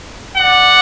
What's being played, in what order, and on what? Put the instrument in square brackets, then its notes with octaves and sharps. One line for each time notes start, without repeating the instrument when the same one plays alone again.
[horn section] D5 F#5